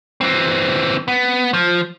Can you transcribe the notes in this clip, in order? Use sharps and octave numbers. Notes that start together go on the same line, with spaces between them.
E3 C4
B3
F3